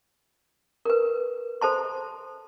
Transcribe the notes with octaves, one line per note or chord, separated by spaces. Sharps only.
A#4 B4
A4 C5 A5 C6